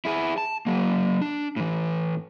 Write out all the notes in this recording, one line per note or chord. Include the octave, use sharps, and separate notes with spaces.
E4 G#4
A5
F#3 A#3
D4
A2 E3